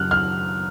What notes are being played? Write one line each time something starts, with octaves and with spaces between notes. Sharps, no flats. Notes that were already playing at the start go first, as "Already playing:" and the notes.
Already playing: F#2 C#3 F6 F#6
F6